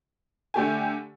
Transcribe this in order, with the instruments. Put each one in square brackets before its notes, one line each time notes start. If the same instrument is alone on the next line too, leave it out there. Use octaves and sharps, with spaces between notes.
[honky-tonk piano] D3 A3 G4 G#5